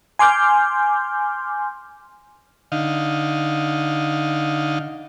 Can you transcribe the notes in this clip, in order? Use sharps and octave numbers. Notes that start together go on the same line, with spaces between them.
G#5 C6 D6 F6 G6
D3 D#4 F5